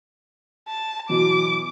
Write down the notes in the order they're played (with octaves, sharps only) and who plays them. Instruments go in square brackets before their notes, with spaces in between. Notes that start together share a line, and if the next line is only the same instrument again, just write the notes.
[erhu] A5
[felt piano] B2 E3 F#3 [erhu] D6